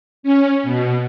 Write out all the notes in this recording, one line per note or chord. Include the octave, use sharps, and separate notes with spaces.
C#4
B2